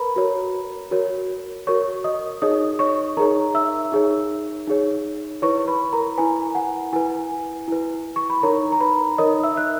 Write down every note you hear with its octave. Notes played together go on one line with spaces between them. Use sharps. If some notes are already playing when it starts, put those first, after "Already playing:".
Already playing: A#4 B4 A#5 B5
F#4 A#4 C#5
F#4 A#4 C#5
F#4 A#4 C#5 C#6
D#5 D#6
D#4 G#4 C#5 D#5 D#6
C#5 C#6
D#4 G#4 A#4 C#5 A#5
E5 E6
D#4 G#4 C#5
D#4 G#4 C#5
E4 B4 C#5 C#6
B4 B5
A#4 A#5
E4 B4 G#5
F#5
E4 B4 G#5
E4 B4
C#6
B5
D#4 A#4 C#5 A#5
A#5
B4 B5
D#4 A#4 C#5 D#5 D#6
E5 E6
F#6